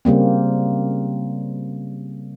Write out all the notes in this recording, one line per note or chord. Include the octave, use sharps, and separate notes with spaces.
C#3 G3 A#3 C4